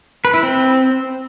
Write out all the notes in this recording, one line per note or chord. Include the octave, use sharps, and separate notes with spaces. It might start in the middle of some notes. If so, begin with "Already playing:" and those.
B4
E4
C4